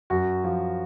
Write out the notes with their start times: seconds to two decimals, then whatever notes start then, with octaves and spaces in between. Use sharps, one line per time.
0.10 F#2 F#4
0.44 F3